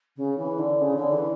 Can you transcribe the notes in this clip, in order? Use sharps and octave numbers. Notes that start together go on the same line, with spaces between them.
C#3
E3
D3
C#3
D3
E3